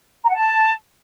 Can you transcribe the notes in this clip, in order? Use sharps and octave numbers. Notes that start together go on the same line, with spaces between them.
A#5
F#5
A5